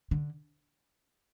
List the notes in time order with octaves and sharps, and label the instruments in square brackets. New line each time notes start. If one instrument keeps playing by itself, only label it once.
[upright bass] D3